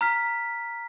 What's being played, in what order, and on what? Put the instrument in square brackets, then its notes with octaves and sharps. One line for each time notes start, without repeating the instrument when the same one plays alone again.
[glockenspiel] A#5 F6 B6